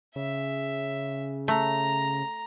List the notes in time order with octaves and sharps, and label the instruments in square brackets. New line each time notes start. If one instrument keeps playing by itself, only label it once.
[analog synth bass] C#3 [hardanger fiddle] E5
[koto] A3 [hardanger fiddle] A#5